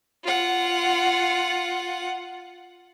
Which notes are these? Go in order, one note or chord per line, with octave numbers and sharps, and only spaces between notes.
F4 F#5